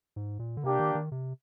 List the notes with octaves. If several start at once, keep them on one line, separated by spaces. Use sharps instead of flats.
G#2
A#2
D3
C3 A#3 D4 G4
D#3
D#3
C3